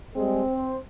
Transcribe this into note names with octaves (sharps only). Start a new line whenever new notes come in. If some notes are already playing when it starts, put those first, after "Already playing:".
G3 G#3 C4
C5